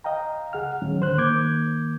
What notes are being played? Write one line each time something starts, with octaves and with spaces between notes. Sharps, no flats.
D#5 F5 G5 A#5
C#2 G#4 F#5 F6
D#2 A2 D#3 F#3 C#4
D2 D3 C5 F#6
D#3 A#3 D6 G6 G#6